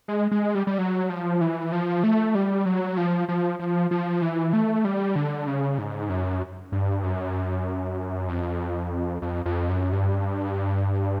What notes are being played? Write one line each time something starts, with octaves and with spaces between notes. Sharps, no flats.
G#3
G#3
G3
G3
F#3
F3
E3
F3
A3
G3
F#3
F3
F3
F3
F3
E3
A3
G3
D3
C#3
G#2
F#2
G2
F#2
F2
F2
F2
F#2
G2